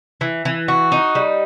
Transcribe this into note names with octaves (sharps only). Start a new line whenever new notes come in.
E3
E3
F#4
D#4
G3